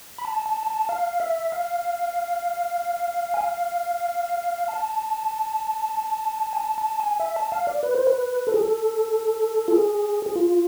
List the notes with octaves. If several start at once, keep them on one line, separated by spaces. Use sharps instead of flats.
B5
A5
A5
A5
F5
E5
F5
G#5
F5
A5
G#5
A5
A5
G#5
E5
A5
F5
D5
B4
C5
B4
A4
G#4
A4
F4
G#4
G#4
F4